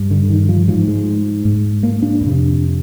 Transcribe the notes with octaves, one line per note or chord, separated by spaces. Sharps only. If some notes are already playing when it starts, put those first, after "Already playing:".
Already playing: G2
D3
D#3
F3
G#2 F3
G#3
G#2
A#3
D4
F2
C3